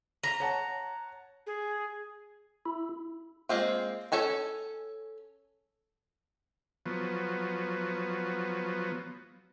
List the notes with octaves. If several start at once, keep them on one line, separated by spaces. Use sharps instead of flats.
A#5
C#5 F#5 A5
G#4
E4
G#3 A#3 C4 F4
C#4 A4 G#5 A#5
F3 F#3 B3